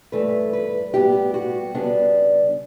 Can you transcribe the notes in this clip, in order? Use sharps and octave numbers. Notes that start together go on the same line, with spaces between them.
G2 E3 A3 B4
B4
A2 G3 B3 G4
F#4
C#3 G3 B3 D4